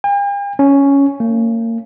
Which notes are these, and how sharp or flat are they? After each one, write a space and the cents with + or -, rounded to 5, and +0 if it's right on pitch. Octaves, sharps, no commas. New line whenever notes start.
G5 +45
C#4 +5
A#3 -35